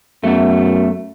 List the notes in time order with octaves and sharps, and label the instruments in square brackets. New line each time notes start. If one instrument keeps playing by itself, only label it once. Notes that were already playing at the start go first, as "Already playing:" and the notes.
[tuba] F#2 [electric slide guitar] A3 B3 E5